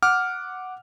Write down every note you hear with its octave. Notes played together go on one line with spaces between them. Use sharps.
F#5 D6 F6